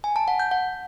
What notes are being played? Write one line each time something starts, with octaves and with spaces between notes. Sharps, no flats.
G#5
A5
F#5
G6
F#5